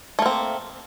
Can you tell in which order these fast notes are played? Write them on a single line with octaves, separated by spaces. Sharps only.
A3 A#3 C4